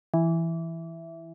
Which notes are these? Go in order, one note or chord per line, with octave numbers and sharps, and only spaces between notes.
E3